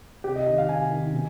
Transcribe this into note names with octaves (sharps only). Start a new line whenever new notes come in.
C3 G4
D#5
D#3 D#5
F5
C3 G#5
D#3
B2